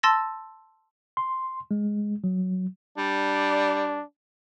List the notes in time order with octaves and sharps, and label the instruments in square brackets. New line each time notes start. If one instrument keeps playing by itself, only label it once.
[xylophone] A5 C6 E6 A6 A#6
[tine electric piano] C6
G#3
F#3
[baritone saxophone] G3 [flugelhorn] D4